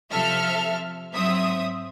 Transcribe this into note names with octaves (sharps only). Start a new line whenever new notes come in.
C3 F3 A4 E5 F6
G#2 F#3 C4 E5 D#6